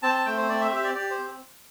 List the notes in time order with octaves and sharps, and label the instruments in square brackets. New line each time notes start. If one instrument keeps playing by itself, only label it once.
[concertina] C4 A5
A5
A3 G5
C5
C4 D5
E5
G4 E5
D5
G4 D5
C5
C4